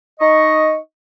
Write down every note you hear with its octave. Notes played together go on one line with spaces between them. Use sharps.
D#4 D#5 C#6